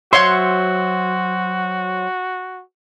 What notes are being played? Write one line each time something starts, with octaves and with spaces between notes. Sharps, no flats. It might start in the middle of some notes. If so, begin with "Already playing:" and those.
F#3 F#4 C5 C#5 E5 F#5 C6